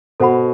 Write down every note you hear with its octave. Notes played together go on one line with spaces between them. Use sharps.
B2 A4 C5 F#5 B5